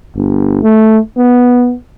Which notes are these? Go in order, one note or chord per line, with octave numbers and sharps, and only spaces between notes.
G1
A3
B3